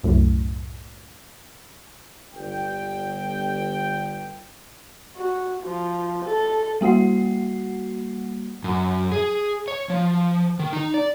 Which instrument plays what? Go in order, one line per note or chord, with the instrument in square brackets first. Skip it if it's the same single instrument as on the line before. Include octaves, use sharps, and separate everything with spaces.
[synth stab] C2 F#2 A2
[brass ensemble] G1 G5
[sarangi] F#4
F3
A4
[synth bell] G3 A#3 F#4 F#5 C7
[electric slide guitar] F#2
G#4
C#5
F3
D#3
D#4
D5